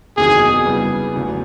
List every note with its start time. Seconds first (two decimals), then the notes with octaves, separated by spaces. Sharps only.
0.17 F#1 E2 C3 D#3 F#3 G#4
0.66 C#3 E3 G3 B3
1.14 F1 E2 C#3 F#3